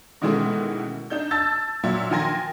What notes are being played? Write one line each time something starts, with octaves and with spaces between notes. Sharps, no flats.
B2 D#3 E3 G#3 A3 C#4
D4 D#4 G6
A5 E6 A6
A#2 F#3 E5
D#3 F3 G5 G#5 C6 A#6